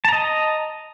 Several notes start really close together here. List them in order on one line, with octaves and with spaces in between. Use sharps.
A5 A#5 D#5